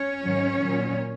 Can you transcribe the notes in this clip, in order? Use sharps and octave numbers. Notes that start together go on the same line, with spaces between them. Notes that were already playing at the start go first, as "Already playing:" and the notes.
Already playing: C#4 C#5
G#2 D#3 F#3
A#2 F#3